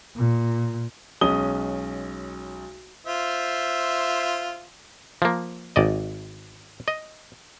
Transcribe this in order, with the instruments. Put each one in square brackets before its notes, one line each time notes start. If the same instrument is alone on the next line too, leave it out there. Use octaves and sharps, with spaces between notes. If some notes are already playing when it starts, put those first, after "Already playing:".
[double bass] A#2
[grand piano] B1 G#3 C#4 D#6 G7
[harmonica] F4 C5 E5
[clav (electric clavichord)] F3 A#3
G#1 D5 D#5
D#5